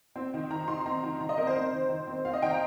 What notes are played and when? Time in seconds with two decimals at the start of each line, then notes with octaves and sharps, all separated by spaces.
0.16 C4
0.34 D#3
0.50 D#3 A#5
0.68 D#3 C6
0.86 C4 A#5
1.03 D#3
1.20 D#3 A#5
1.29 D#5
1.37 C4 A#4
1.47 C5
1.55 C4
1.73 D#3
1.89 D#3
2.07 C4
2.25 C4 F5
2.33 D#5
2.42 D#3 G5
2.51 A#5